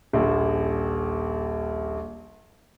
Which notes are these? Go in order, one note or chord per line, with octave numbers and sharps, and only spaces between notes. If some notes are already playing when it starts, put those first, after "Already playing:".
D#1 A#1